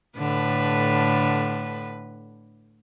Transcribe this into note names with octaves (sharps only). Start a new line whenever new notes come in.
A2 D3 B4